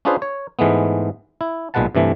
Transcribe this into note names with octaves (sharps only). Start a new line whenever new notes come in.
C#4 D4 F4 G#4 B4 C5
C#5
G#2 E3 G#3 A3 B3
E4
B1 A#2 G#3 B4 F#5 A5
G2 C3 E3 A3